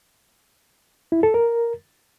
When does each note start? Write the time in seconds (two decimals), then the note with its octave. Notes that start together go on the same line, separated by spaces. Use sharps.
1.12 E4
1.23 A4
1.34 A#4